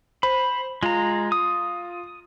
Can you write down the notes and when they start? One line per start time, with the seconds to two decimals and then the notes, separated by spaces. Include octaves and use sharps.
0.23 C5 B5
0.83 G#3 F4 A#5
1.32 D#6